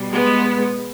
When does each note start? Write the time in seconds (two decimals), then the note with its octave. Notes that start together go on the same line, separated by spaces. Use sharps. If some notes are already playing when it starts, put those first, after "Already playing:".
Already playing: B2 G3
0.13 G#3 B3